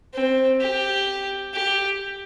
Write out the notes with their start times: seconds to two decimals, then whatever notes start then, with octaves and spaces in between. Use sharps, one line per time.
0.14 C4
0.61 G4
1.54 G4